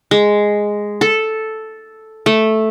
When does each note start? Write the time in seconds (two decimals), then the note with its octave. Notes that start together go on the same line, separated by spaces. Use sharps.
0.11 G#3
1.01 A4
2.26 A3